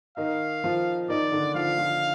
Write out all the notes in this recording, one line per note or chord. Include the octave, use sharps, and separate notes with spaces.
D#3 D#4 F5
F3 F4
D#3 D#4 D5
D3 D4
F3 F4 F5
F3 F4